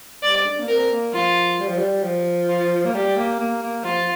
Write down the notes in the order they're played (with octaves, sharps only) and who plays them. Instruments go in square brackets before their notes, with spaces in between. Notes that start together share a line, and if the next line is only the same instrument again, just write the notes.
[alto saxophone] G3 [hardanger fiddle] D5
[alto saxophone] D4
A#3
[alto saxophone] C4 [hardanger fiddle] A#4
[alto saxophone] A#3
[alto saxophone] F3 [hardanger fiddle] F4
[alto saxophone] G3
F3
G3
F3
[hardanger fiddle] F4
[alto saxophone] A#3
[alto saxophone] G3 [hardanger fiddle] G4
[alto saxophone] A#3
A#3
A#3
[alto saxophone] F3 [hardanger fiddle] F4